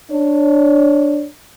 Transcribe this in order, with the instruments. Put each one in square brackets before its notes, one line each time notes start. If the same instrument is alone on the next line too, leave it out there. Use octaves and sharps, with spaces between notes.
[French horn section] D4 C#5